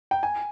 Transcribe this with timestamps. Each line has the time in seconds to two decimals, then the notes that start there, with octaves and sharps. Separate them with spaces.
0.11 G5
0.23 G#5